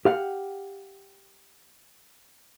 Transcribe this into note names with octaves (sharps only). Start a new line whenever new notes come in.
G4 F5 F#5